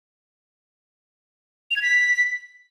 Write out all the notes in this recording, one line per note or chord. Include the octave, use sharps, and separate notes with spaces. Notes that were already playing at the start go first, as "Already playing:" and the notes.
F7
G#6
B6